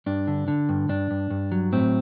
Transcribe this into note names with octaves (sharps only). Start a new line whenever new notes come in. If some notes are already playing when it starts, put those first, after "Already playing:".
G2 D4
D3
D3
G2
G2 D4
G2
G2
F#3
A2 C4